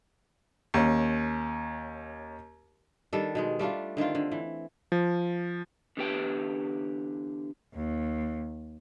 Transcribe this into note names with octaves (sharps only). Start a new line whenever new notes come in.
D#2 C#4
D#3 G3 D4 A4
B2 D#3 G#3
G3 A3 D4 F4
D3 D#3 C4 F4
D3
E3
F3
D3 E3 B3 G4 B4 G5
D#2